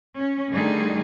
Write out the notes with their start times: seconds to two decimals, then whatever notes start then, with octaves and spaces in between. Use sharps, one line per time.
0.17 C#4
0.50 D3 D#3 G3 A3 D#4 G#4